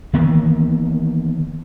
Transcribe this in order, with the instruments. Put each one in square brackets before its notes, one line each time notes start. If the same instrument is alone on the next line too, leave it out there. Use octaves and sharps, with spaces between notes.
[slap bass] D#3 E3 A#3 B3